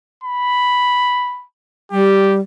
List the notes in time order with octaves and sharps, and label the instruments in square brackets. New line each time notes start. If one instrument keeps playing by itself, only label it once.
[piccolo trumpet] B5
[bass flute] G3 [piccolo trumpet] G4